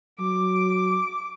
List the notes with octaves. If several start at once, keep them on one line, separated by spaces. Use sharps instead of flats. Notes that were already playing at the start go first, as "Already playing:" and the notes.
F#3 D6